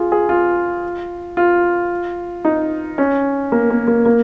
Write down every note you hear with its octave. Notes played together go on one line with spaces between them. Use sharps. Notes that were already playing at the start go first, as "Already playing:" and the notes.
Already playing: F4 G#4
G#4
F4
F4
D#4
C#4
A#3
A#3
A#3
A#3